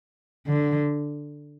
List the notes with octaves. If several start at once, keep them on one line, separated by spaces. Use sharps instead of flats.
D3